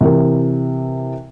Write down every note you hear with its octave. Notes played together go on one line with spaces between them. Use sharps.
C3 E3 A#4